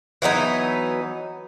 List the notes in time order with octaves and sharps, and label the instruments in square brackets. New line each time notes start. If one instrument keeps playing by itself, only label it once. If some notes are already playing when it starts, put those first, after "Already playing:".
[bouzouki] E3 F#3 B3 D#4